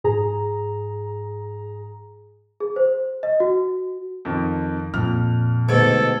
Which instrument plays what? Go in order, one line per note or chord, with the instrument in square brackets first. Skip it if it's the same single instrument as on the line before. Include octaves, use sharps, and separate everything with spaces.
[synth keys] G#2 G#4 A#5
[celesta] G#4
C5
D#5
F#4
[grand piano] F2 D#3
[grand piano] F2 F6 [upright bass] A#2
[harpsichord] D2 G#2 B2 [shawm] A4 [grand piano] G#6